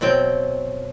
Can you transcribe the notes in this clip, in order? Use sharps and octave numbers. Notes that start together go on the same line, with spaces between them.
B2 F#3 C4 G5